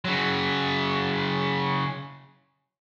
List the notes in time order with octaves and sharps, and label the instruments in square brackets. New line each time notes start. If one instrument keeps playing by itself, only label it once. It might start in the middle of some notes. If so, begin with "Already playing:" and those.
[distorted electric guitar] C#3 F#3